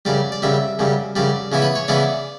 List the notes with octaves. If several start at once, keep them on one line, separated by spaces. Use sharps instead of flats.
F#2 C#3 G3 D5
D5
F#2 C#3 G3 E5
F#2 C#3 G3
F#2 C#3 G3 D5
C#3 E3 B3 E4
B4
C#5
C#3 E3 B3 E4 D5